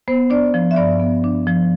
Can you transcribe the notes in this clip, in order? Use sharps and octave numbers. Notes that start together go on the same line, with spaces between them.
B3 C5
D4 D5
F3
E5
G2 D5
B3
D4
F3